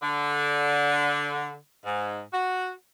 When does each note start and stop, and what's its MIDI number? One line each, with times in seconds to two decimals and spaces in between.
0.03 1.54 50
1.85 2.21 44
2.33 2.71 66